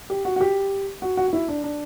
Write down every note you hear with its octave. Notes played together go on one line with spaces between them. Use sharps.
G4
F#4
F#4
G4
F#4
F#4
F#4
E4
D4
D4